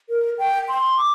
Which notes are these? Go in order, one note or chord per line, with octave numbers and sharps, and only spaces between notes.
A#4
G5
C6
D6